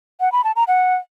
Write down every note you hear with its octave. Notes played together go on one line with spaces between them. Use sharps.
F#5
B5
A5
A#5
F#5